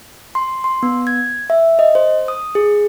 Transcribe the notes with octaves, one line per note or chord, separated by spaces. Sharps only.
C6
C6
B3
G#6
E5
D#5
C5
D#6
G#4